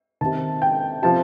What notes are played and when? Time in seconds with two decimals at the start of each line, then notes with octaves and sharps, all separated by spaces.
0.21 C3 D#3 A5
0.62 G5
1.02 C3 F3 A5